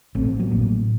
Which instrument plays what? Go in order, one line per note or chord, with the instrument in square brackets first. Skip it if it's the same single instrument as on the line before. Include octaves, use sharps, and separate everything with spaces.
[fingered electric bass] A1 A3 C4
F#3 A#3
A2